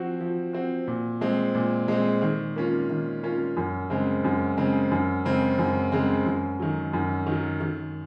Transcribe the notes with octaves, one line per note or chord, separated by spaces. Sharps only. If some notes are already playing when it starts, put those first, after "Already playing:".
Already playing: F3 C4 F#4
F3
C4 F#4
A#2
G#3 C4
A#2
G#3 C4
D#3
A#3 C#4 F4
D#3
A#3 C#4 F4
F#2
C#3 G#3 C4
F#2
C#3 G#3 C4
F#2
C#3 G#3 C4
F#2
C#3 G#3 C4
F#2
D#3 F#3
F#2
D#3 F#3
D#3